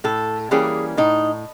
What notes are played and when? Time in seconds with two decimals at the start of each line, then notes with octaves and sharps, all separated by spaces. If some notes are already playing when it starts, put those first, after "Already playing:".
0.04 A2 A4
0.51 E3 G3 A#3 C#4 G#4
0.97 A2 D#4